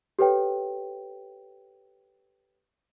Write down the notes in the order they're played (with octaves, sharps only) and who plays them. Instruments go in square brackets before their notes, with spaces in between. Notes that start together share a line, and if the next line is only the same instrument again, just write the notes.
[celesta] G4 A4 B4 C#5 G5